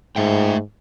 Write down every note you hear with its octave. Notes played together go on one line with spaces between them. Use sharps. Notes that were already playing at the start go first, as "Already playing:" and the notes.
G#2 A3 E5 G5